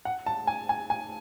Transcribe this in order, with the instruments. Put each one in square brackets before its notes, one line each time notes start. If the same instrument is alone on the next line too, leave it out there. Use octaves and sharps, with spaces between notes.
[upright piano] F#5
A5
G#5
G#5
G#5